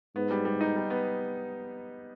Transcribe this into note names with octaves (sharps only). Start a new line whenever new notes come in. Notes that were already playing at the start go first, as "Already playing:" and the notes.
G#2 B3
G3
G3
D#4
G3
B3